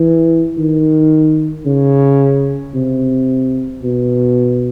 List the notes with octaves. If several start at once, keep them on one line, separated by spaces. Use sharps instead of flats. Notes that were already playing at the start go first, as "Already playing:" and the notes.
Already playing: E3
D#3
C#3
C3
B2